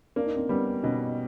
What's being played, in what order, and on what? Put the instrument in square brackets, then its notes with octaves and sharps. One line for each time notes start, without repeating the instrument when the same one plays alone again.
[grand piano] A#3 [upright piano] D4
[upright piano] D#4
C4 D4
[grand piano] G3 [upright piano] B3 C#4
[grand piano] B2 [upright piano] C#4 D#4